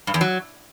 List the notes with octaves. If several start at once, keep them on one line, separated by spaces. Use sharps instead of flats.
G2
E2
F#3